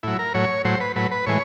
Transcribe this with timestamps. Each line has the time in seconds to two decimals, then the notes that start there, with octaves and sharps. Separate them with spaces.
0.03 A2 F#3 E4
0.19 A#4
0.34 A2 F#3 C#5
0.65 A2 F#3 C5
0.80 B4
0.96 A2 F#3 B4
1.11 B4
1.26 A2 E3 G#3 C#5